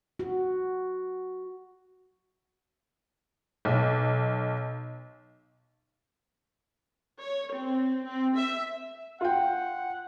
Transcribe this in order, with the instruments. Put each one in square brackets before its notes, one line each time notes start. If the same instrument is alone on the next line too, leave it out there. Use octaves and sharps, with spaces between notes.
[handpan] F#4
[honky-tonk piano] B1
[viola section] C#5
C4
C4
E5
[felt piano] F4 G5 [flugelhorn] F#5